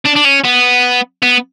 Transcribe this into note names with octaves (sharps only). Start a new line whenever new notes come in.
D4
D4
C#4
B3
B3